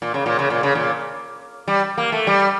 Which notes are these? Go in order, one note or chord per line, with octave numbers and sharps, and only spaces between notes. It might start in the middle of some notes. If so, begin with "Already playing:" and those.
A#2
C#3
A#2
C#3
A#2
C#3
A#2
G3
A#3
A3
G3